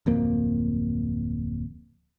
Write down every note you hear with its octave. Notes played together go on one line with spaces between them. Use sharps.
D1 F2 A#3